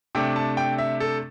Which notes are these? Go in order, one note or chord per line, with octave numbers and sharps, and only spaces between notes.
C3 A3 D4 G5
A5
G5
E5
A4